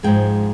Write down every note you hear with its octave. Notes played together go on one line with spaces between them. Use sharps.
G#2 F3 G#3 G5